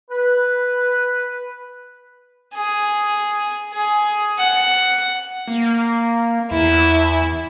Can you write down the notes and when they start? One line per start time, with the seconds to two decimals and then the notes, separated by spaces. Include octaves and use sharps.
0.10 B4
2.54 G#4
3.73 G#4
4.38 F#5
5.48 A#3
6.51 E2 E4